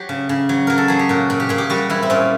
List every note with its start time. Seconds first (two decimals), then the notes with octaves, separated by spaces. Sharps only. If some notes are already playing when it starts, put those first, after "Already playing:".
Already playing: F#3 G4
0.09 C#3
0.29 C#3
0.49 F#3
0.67 F#3 A#4
0.78 A4
0.88 F#3 G#4
0.99 G4
1.09 A#2 F#4
1.30 A#2
1.40 G4
1.49 A#2 G#4
1.58 G4
1.70 G3 F#4
1.90 G3 E4
2.03 C4
2.10 A#2 C#4